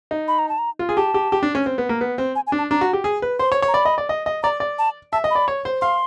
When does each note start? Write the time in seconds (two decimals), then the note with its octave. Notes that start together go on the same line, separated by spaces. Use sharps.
0.11 D#4
0.28 B5
0.39 A#5
0.49 A5
0.58 A#5
0.79 F4
0.89 G#4
0.97 G4 A5
1.14 G4
1.32 G4
1.43 D4
1.55 C#4
1.66 C4
1.78 B3
1.89 A#3
2.01 B3
2.18 C4
2.35 G#5
2.47 G#5
2.52 D4
2.58 A5
2.71 D4 A#5
2.81 F#4
2.93 G4
3.04 G#4
3.22 B4
3.39 C5 C6
3.52 C#5
3.62 C#5
3.68 A#5
3.74 D5 B5
3.85 D#5
3.98 D5
4.09 D#5
4.26 D#5
4.43 D5 A#5
4.60 D5
4.79 A5
5.12 E5 A5
5.24 D#5
5.31 D5 B5
5.48 C#5
5.65 C5
5.81 F5 C6